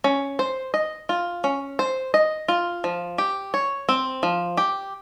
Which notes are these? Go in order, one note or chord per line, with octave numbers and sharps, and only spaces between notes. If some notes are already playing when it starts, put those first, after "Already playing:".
C#4
C5
D#5
F4
C#4
C5
D#5
F4
F3
G4
C#5
C4
F3
G4